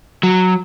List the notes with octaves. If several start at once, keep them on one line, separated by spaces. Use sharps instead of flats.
F#3